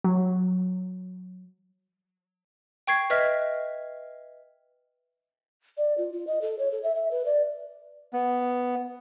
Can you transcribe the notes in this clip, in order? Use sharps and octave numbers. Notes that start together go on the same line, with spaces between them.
F#3
G5 C#6 G#6 C7
B4 D#5 E5 F6 B6
D5
F4
F4
D#5
A4
C#5
A4
E5
E5
B4
D5
B3